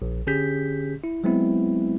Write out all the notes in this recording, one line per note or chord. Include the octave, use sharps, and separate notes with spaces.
A#1
D3 C#4 G4 G#4 G6 B6
E4
F#3 G#3 B3 C4 E4